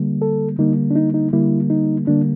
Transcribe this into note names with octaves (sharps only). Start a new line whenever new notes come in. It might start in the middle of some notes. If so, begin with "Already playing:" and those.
Already playing: D3 G3 A#3
A4
D3 G3 A#3 D#4
D4
D#4
D#4
D3 G3 A#3 E4
D#4
D3 G3 A#3 D4